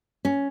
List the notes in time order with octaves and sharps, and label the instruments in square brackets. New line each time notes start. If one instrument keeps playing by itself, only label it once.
[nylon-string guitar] C#4